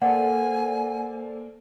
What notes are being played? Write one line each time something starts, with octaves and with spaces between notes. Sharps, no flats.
A#3 A4 C5 D5 F#5 G#5